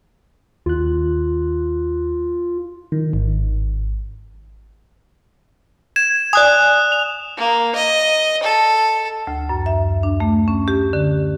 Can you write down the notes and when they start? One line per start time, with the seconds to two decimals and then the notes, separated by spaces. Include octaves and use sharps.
0.66 D#2 F4 F#6
2.92 D#3
3.13 G#1
5.96 G#6 E7
6.33 D5 G#5 D#6 F#6
6.92 F7
7.38 A#3
7.75 D#5
8.43 A4
9.27 D2
9.49 F#2
9.66 E5
10.03 D4
10.20 A3
10.48 C#4
10.68 G4
10.93 D3